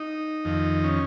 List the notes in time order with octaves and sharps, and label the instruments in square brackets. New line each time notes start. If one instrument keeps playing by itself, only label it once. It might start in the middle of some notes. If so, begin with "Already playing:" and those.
Already playing: [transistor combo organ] D#4
F2 D#3
C#4